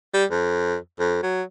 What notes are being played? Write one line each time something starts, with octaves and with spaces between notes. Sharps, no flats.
G3
F2
F2
F#3